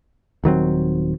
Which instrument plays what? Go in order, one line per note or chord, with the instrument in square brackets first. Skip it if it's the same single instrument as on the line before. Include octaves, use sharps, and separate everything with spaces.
[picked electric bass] D#1 D#3 F#3 C4